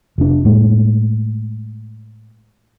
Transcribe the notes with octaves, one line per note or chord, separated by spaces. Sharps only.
F1 D4
A2 G#3 A#3